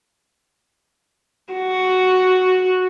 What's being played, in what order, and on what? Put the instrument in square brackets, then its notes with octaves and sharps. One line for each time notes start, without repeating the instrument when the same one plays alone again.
[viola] F#4